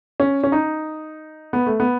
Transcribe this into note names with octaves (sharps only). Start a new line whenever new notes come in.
C#4
C#4
D#4
B3
A3
B3